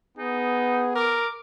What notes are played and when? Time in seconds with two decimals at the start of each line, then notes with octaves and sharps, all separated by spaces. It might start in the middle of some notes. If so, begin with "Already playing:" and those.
0.18 B3 D#4 G#4
0.95 A#4 D6